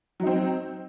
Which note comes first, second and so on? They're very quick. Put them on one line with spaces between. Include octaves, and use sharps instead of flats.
F#3 D#4 C4